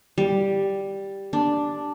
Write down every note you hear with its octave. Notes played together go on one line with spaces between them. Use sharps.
G3
D4